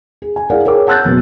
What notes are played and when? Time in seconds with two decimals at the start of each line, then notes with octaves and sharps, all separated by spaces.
0.22 G#4
0.36 G#5
0.50 E4 G#4 A#4 D5 F5 F#5
0.65 G#4 A#4 C#5 G5 D6
0.87 F#5 A5 E6 F#6 G6 A6
1.05 F#1 B2